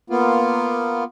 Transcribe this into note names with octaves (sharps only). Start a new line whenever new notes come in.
A#3 B3 F4